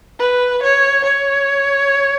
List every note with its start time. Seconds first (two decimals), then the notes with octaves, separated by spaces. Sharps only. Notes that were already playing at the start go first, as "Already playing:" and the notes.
0.19 B4
0.63 C#5
1.04 C#5